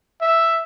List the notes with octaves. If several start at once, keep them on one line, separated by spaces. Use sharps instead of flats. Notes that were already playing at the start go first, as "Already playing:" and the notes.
E5